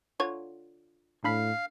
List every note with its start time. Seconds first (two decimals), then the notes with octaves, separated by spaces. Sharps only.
0.20 D3 F4 C#5
1.24 A2 D4 F5 B5 B6